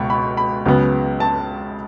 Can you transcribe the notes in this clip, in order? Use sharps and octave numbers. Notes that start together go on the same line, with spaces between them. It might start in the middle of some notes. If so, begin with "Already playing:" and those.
Already playing: C#2 B2 C#6
B5
B5
C#2 C#3 F#3 B3
A5